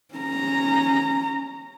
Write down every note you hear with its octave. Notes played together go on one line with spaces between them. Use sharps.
C#4 A#5